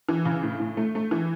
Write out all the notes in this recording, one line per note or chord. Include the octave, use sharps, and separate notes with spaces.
E3
C#3
A2
A2
A3
A3
E3